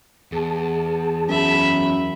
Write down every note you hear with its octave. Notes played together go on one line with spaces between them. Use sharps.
E2 G#4 A5
F#2 E5 B5